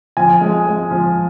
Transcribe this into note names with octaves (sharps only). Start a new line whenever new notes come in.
F3 G#5
G#3
G#3
F3